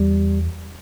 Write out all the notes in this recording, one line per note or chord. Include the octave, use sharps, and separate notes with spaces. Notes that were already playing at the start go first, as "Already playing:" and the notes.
Already playing: E2 G3